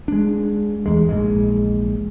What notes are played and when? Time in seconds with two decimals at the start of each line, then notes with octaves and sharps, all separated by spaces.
0.08 G#3 D4
0.86 E2 G#3
1.09 A#1 G#2 G#3